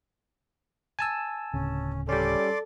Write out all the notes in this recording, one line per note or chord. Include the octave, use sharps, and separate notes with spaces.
G#5 A5 E6
D1 C#3 C#4
G3 C#4 A4 D5 C6 D6